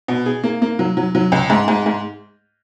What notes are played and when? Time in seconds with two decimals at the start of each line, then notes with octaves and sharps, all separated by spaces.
0.08 B2
0.26 G#4
0.44 A#3
0.62 A#3
0.79 F#3
0.97 F#3
1.15 F#3
1.32 C#2
1.50 G#2
1.68 G#2
1.86 G#2